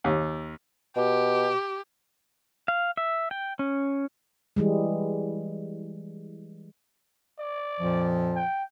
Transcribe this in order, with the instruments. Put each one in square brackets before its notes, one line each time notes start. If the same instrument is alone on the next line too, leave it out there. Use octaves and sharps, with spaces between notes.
[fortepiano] D#2
[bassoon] B2 [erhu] G4
[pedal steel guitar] F5
E5
G5
C#4
[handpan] E3 G3 G#3
[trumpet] D5
[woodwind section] F2 A#2 F3
[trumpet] G5